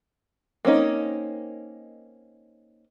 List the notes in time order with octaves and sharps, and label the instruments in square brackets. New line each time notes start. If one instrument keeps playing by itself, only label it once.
[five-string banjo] A#3 C4 C#4 D#4